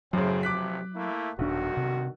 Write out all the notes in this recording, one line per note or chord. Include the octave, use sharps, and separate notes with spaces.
F#2 A2 C#3 F#3 C4
A1 C3 F3 D6 F#6 B6
A3 A#3 E4
D#1 B1 G2 D#3 D4 F#4
C3